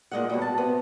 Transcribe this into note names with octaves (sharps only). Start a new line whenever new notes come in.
A#2 G#3 F#5
B2 F#3 G3
A5
C3 B3